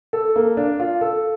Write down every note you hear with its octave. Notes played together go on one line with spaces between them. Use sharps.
A4
A#3
D4
F4
A4